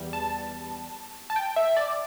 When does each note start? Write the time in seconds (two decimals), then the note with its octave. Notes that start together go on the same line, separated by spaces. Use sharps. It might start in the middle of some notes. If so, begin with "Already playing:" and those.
Already playing: E2 G3
0.13 A5
1.30 A5
1.36 G5
1.56 E5
1.77 D5